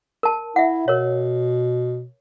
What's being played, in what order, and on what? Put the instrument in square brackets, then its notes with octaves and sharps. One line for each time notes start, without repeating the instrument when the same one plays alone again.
[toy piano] A#4 A5
[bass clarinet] E4 [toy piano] E5 F#5
[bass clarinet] B2 [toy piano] A#4 C#5